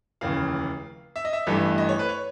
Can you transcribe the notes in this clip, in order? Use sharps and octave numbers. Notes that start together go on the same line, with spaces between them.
F1 D#2 C#3 E3 F5
E5
D#5
E5
A1 G2 E3 A3
D#5
C#5
B4
C#5